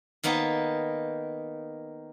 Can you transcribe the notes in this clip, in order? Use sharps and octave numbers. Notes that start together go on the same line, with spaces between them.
D#3 A#3 B3 D#4